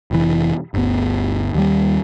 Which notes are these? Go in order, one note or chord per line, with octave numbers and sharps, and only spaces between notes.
F1 E3
G1 D2 B3
D#2 G3